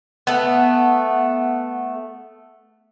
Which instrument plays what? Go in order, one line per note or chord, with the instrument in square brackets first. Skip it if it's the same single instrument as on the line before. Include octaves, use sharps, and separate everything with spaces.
[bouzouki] A3 B3